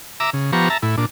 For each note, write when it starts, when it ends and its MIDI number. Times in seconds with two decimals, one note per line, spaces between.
0.20 0.30 76
0.20 0.30 82
0.20 0.30 86
0.20 0.30 88
0.33 0.51 49
0.52 0.69 53
0.52 0.69 59
0.52 0.69 67
0.52 0.69 82
0.52 0.69 85
0.70 0.78 76
0.70 0.78 81
0.70 0.78 82
0.82 0.96 45
0.82 0.96 64
0.98 1.06 46
0.98 1.06 62